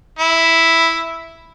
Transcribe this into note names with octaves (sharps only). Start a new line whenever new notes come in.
E4